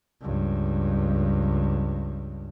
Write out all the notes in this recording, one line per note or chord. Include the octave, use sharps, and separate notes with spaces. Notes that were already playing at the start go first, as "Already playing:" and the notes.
C#2 G2